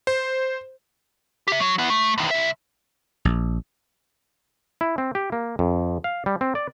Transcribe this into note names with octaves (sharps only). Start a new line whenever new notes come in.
C5
G4 E5
F#3
B3 E4
A3
E2 D#3
C2 E5
A#1
E4
C4
G4
A#3
F2
F5
G3
C4
D5